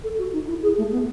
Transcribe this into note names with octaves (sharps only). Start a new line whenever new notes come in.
A4
F#4
D#4
E4
G#4
A3
B3